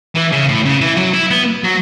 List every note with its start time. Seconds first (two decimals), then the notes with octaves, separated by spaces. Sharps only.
0.16 E3
0.33 C#3
0.49 A2
0.65 C#3
0.81 E3
0.97 F#3
1.14 E4
1.31 B3
1.64 F#3